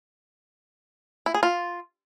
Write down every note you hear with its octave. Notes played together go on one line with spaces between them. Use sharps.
E4
G#4
F4